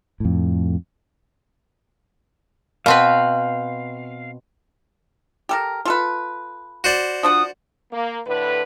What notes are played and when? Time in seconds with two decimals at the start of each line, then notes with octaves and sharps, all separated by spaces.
0.20 F2 A2
2.86 B2 C4 B4 F5
5.49 G4 A4 A#4
5.85 F4 A4 B4
6.84 F#4 C5 D5
7.23 F3 D4 F#5 D#6
7.92 A#3
8.26 A2 D3 B4